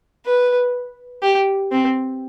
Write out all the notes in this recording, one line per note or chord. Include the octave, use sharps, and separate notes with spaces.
B4
G4
C4